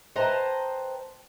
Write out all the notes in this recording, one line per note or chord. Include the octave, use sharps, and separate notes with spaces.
B4 C5 D#5 G5 A5 A#5